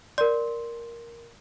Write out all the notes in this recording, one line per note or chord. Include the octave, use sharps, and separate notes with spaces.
A#4 D5 C6